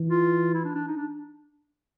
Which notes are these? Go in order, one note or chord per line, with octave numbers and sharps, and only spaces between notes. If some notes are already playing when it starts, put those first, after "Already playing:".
Already playing: E3
F4
E4
D4
D4
D#4
D4